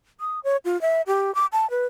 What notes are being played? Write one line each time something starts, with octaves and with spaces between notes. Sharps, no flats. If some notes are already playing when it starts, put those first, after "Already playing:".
D#6
C#5
F4
E5
G4
D6
A5
B4